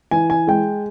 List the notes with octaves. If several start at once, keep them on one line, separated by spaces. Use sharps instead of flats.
E3 G#5
G#5
G#3 G5